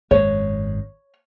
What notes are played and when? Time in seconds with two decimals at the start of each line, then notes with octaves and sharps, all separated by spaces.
0.11 G#1 F#2 G#3 C#5